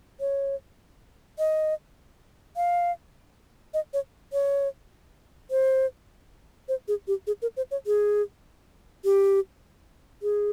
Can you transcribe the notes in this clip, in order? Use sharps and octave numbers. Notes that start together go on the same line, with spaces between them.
C#5
D#5
F5
D#5
C#5
C#5
C5
C5
G#4
G4
G#4
A#4
C5
C#5
G#4
G4
G#4